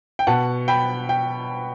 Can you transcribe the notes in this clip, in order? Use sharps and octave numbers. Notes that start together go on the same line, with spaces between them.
G5
B2 F#5 A5
G5 B5
G5